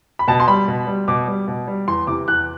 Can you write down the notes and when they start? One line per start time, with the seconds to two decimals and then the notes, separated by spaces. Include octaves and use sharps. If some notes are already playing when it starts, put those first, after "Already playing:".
0.19 B5
0.28 B2 A5
0.40 C6
0.48 G3 B5
0.68 B2
0.87 G3
1.08 B2 D6
1.28 G3
1.48 B2
1.67 G3
1.88 E2 C6
2.07 C3 E3 D6
2.28 E2 F#6